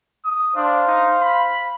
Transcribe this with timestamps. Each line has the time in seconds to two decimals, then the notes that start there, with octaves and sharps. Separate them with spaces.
0.25 D#6
0.56 D4 C5 F5
0.87 D#4
1.21 B5